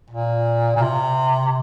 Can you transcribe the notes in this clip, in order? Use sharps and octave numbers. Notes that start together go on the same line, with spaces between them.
A#2
A#2
C3